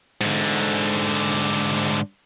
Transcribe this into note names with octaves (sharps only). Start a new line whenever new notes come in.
G#2 D3